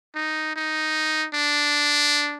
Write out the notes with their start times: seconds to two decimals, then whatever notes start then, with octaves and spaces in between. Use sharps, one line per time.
0.15 D#4
0.56 D#4
1.34 D4